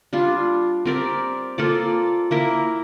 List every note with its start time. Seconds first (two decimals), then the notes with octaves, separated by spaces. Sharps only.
0.13 G3 D4 F4
0.85 C4 G4 A#4 D5
1.58 A#3 F4 A4 D5
2.31 A#3 E4 A#4